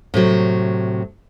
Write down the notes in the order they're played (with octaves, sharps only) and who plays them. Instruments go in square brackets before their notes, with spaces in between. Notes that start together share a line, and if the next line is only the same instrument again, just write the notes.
[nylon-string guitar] A2 C3 F#3